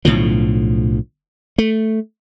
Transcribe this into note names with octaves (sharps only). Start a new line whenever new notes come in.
B1 A2 D3 F3
A3